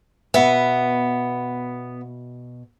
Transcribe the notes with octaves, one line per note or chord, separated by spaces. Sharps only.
B2 B3 F#4 E5